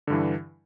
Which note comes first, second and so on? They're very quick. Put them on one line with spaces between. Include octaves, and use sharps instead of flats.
D3 G2 E3